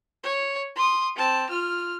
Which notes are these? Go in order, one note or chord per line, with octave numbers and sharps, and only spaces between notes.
C#5
C6 D#6
C4 A5
F4 F6